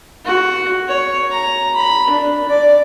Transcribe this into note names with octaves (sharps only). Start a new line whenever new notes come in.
F#4
C#5
A#5
B5
D4
D5